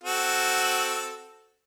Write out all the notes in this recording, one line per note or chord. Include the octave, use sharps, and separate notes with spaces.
C4 F#4 A4